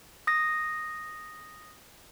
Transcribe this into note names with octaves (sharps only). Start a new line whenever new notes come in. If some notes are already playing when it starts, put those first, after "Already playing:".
D#6 A#6